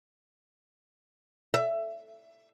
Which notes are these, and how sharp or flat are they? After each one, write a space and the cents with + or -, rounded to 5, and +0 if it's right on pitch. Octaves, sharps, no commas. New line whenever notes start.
E5 +20